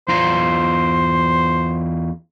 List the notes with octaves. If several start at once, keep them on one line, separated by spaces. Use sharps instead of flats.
E2 F4 C5 A#5